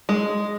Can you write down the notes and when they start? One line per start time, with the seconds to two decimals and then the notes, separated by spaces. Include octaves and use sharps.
0.09 G#3